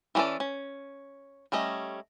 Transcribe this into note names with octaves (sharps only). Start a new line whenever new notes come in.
E3 B3 C#4 A4 D5
C#4
G3 A3 C#4 D#5